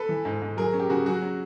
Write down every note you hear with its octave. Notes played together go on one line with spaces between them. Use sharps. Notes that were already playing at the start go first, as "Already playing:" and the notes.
Already playing: A4 B4
E3
G#2
G#2
F#3 G#4 A#4
C#4
G4
C#3 F#4 G#4
F#3 F#4 G#4
C#4